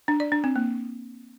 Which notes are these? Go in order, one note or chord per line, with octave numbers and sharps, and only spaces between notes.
D4
D5
D4
C4
A#3